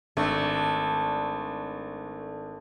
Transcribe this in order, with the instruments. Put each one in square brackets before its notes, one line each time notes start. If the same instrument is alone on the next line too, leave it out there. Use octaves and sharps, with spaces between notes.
[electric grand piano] G#1 D4 [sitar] A3